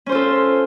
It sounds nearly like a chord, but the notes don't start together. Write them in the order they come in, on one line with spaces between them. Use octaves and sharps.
C#4 C5 F4 A4